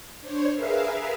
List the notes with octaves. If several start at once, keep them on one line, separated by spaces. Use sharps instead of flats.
D4 C5 C#5
G#4 A#4 B4 E5 F5